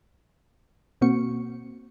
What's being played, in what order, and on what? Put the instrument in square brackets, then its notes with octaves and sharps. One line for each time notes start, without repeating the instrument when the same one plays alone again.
[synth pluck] B2 A#3 C4 F#4 C#6 C#7